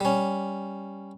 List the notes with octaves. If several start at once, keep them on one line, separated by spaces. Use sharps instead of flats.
G3 C#4